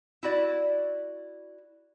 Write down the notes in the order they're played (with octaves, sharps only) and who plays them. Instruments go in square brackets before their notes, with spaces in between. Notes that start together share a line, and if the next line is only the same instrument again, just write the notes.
[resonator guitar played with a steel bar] E4 F#4 D5